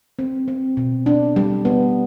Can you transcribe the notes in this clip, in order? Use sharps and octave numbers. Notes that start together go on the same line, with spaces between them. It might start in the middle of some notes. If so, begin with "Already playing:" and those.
C4
C4
B2
D4
G3
B3